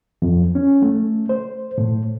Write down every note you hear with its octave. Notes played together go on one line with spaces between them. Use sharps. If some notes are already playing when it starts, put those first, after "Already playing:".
F2
C#4
A3
C5
A2